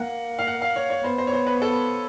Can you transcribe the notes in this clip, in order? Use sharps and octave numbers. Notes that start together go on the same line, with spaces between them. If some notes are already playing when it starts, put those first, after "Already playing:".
Already playing: A#3 F#5
F5
F#5
F5
C#5
C#5
B3 C5
C5
C#5
C5
B4
A4